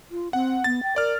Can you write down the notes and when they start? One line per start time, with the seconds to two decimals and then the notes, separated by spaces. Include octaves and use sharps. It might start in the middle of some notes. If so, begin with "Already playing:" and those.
0.11 F4
0.33 C4 F#5
0.64 B3 A6
0.83 G5
0.96 A#4 D5 F6